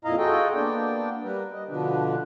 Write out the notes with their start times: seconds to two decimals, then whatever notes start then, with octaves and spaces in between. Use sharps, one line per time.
0.05 F2 A#2 E4 D#5 F5 A#5
0.18 F4 F#4 G#4 A4 D#5 G5
0.55 A#3 B3 D4 D5 G5
1.23 G3 A#4 B4
1.53 D#5
1.69 B2 D3 F3 D4 B4